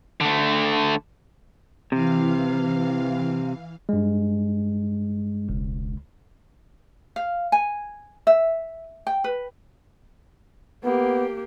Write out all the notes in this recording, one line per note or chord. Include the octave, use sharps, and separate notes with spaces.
D3 A3
C3 E3 F5
G2 G#3
E1 C#2
F5
G#5
E5
G5
B4
A#3 B3 G4